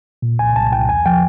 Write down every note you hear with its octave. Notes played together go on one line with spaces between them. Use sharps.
A#2
C2 G#5
C2 A5
C2 G5
E2 G#5
F3 G5